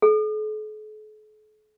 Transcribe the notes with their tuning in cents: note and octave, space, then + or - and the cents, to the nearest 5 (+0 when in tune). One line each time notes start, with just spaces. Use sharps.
A4 -45